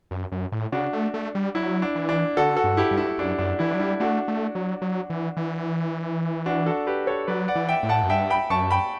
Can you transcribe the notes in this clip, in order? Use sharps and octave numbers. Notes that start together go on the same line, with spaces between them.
F#2
F#2
A2
C#3 D4 F#4
A3
A3
G3
F#3 E4
D4
E3
D4
D3 F#4 A4
F#4 A4
G2
E4 G4
G2
E4
F#2 D4
F#2 D4
E3 E4
F#3 D4
G3 E4
A3 D4 F#4
A3
F#3
F#3
E3
E3
D4 F#4
F#4 A4
G4 B4
A4 C#5
F#3 B4 D5
D5 F#5
E3
E5 G5
A2
F#5 A5
F#2
G2 E5 G5
G5 B5
F#2 A5 C#6
G5 B5